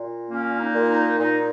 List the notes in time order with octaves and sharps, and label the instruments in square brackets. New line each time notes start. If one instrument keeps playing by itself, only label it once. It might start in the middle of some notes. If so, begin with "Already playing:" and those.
Already playing: [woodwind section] A#2
A#3 C#4
D#4
A#2
D#4
A#2 D#4